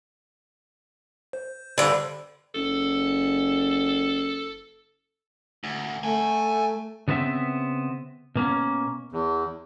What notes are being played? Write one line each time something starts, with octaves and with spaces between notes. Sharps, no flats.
C5
G2 D3
F#1 A4
D2
A3 F#5 G#5
C#3 B3 C4 E5
B2 A#3 C#4
E2